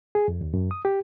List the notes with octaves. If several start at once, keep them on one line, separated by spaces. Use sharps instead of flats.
G#4
F2
D#2
F#2
D#6
G4